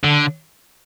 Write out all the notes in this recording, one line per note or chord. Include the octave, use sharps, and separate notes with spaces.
D3